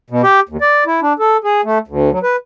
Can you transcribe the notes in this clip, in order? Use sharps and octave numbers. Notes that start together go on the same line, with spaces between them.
B2
G4
D#2
D5
E4
D4
A4
G#4
A3
D2
F#3
B4